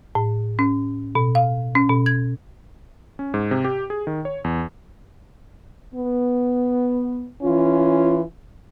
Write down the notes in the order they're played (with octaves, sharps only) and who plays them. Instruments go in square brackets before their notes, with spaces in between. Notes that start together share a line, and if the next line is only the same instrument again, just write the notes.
[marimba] A2
C#4
B2
F5
C#4
B2
G#6
[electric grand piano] C#4
G#2
C3
G4
G#4
D#3
C#5
E2
[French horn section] B3
E3 C#4 F4